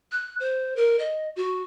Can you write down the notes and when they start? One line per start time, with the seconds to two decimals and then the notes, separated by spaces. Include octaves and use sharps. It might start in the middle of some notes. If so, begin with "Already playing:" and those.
0.12 F#6
0.40 C5
0.76 A#4
0.99 D#5
1.36 F#4